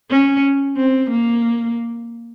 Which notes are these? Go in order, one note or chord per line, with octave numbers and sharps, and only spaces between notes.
C#4
C4
A#3